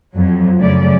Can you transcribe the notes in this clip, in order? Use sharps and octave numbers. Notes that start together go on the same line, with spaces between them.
F2 F#3
F#2 C#3 A3 C#4 D5